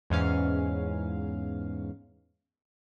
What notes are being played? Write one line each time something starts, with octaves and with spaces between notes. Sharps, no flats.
E2 G#2 C#4 F5